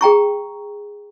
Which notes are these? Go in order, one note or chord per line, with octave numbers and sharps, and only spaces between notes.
G#4 G5 A#5 C#6